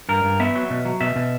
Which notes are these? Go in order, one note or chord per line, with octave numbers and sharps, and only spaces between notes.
G2 A#4
G2
B3 E5
F#3
B2
F#3
B2 E5
B2